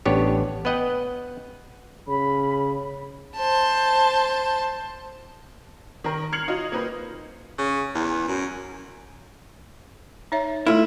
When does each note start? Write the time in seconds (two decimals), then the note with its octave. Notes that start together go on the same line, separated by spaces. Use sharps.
0.06 A1 B3 D4 G4 C#5
0.65 B3 B4 D#5 F#5 G5
2.08 C#3 B5
3.37 C5 A5
6.04 D#3 A#4
6.33 F6 G#6 C7 C#7 F7 F#7
6.48 D#4 F4 F#4 D#5
6.72 A#3 C4 D#4 B4
7.58 C#3
7.95 E2
8.28 F#2
10.32 D#4 C#5 E5
10.67 A3 E4 F4 A4